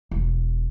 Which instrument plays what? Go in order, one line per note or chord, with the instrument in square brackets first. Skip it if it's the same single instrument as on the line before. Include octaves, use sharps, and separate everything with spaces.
[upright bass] E1